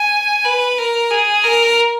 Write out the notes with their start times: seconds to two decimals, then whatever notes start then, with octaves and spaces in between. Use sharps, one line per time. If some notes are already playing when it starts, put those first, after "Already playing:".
Already playing: G#5
0.45 B4
0.78 A#4
1.11 G#4
1.44 A#4